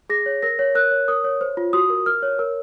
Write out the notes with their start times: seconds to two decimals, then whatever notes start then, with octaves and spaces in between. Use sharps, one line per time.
0.10 G#4 A#6
0.26 C#5
0.42 A#4 A#6
0.59 C#5
0.75 A#4 F#6
0.91 C#5
1.08 A#4 D#6
1.24 C#5
1.41 C5
1.57 F4
1.73 F#4 D#6
1.90 A#4
2.06 A#4 F6
2.22 C#5
2.39 A#4